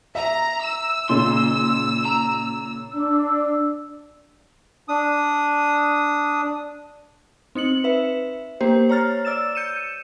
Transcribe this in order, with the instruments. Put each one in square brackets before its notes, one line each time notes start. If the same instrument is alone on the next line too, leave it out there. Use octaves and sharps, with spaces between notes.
[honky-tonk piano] E5 [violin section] A#5
[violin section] E6
[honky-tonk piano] A#2 C#3 D#4 [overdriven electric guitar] C6
[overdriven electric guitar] A#5
[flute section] D4 E6
[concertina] D4 D#6
[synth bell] C4 D#4 C#7 F#7
B4 E5
A#3 G4 C5
C#5 A#5 F6 A6
D5 E6 A6 E7
G6 C#7 D#7 E7